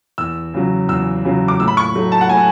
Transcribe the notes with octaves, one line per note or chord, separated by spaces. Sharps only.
E2 E6
C#3 F#3
E2 E6
C#3 F#3
D6
A2 E6
B5
C#6
F#3 A3
A5
F#5
A2 G#5